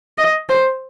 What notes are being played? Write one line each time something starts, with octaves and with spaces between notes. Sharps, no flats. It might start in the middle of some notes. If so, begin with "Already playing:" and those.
D#5
C5